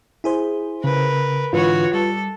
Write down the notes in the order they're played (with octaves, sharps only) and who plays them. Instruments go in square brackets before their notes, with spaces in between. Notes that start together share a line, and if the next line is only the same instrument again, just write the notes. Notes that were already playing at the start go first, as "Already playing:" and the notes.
[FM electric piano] E4 G#4 C5
[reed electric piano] C#3 [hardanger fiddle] A#4 B4
[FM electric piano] G#2 D3 E3 [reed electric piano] F4 B4 [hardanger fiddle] F#4 C#5
[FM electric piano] G3 [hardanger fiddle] A4